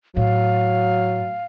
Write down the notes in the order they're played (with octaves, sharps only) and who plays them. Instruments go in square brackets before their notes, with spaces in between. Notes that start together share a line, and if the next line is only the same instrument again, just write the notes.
[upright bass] A2 [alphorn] F#3 [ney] F5